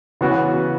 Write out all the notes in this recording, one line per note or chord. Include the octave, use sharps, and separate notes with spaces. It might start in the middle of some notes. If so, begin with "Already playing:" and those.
C#3 E3 B3 F#4